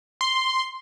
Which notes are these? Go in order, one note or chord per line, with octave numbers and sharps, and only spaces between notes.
C6